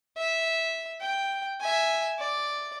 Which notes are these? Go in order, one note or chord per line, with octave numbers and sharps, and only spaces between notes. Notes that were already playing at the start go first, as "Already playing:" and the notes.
E5
G5
E5 G#5
D5